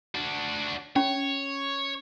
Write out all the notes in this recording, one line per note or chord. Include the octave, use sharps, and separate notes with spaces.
D4 F#4
C#4 C#5